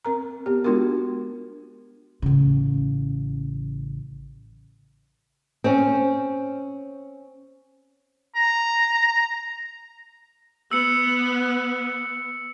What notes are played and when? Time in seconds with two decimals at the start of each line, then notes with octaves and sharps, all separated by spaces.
0.05 C4 A#4 A#5
0.46 B3 G4
0.64 G#3 B3 D4 F4 F#4 A#4
2.22 A1 C#3
5.64 C4 C#4
8.35 A#5
10.71 B3 E6 C#7